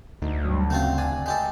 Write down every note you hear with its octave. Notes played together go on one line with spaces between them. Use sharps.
D2 A3 D#4
G2 F#3
C#3 A3 C4 F4
D4 G#5
G#3 G4 A4